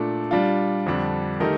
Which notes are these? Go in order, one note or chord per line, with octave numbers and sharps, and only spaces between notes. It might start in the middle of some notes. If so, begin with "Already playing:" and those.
Already playing: A#2 A3 D4 A4
G3 D4 F4
F2 D3 G3 D4
D#3 A3 D#4 G4 A#4